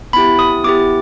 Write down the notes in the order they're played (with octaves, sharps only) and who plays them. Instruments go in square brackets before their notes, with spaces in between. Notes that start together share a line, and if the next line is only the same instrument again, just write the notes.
[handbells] B3 E4 G4 B5
D#6
B3 E4 G4 D6